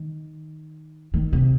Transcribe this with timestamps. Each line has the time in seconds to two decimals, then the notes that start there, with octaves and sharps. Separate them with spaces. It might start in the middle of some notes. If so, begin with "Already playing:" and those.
Already playing: D#3
1.14 D#3
1.33 C3